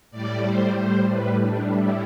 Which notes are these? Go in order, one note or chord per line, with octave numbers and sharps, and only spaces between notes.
A2 G3 D5
C5
C5
B4
D4
E4